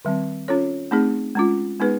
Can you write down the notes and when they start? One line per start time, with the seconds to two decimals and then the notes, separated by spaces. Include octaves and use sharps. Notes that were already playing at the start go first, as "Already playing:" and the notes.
0.05 D#3 G3 C4
0.48 C#4 F4 A4 C#5
0.91 A3 C4 D#4 G#4
1.35 G#3 C#4 F4
1.79 G#3 B3 D#4 G#4 B4